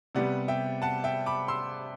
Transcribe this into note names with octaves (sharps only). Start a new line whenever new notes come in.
C3 G3 B3 D5 F#5
E5 G5
F#5 A5
E5 G5
B5 D6
C6 E6